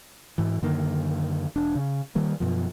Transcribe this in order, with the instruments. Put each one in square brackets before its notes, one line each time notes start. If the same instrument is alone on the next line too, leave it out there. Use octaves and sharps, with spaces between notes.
[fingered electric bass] G#2 E3
F#2 D3 D#3 A#3
E1 D4
C#3
D#3 G3 A#3
F#2 B2 F3